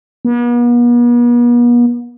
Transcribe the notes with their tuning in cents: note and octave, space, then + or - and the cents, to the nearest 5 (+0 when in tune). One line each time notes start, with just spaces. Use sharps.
B3 -45